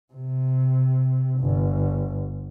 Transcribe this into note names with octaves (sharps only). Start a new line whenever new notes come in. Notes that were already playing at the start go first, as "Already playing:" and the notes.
C3
G1